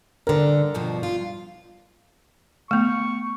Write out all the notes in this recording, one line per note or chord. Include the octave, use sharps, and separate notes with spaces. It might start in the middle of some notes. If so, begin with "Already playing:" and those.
G2 D3 A#4
G2 B2 F3
F4
A3 B3 C#6